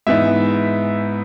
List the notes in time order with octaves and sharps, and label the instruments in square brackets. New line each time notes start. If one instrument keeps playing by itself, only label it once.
[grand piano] G#2 E3 B3 D#4 E5